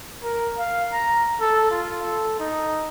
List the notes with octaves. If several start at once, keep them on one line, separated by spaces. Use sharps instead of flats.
A#4
F5
A#5
A4
F4
A4
D#4